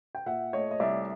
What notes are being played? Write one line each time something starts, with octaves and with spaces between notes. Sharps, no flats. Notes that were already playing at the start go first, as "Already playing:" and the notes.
G5
A#2 E5 F#5
A3 C#5 D#5
D#5
C2 D5 E5